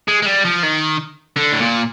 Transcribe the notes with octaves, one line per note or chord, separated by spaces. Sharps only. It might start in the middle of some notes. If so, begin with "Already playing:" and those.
G#3
G#3
G3
F3
D#3
D3
A2
A#2